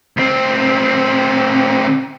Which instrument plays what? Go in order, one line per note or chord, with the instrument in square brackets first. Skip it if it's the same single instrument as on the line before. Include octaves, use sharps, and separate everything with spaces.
[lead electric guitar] D2 C4